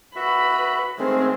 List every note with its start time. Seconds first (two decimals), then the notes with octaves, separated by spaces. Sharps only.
0.16 F#4 B4 E5 B5
0.98 D#3 G#3 A3 C4 G#4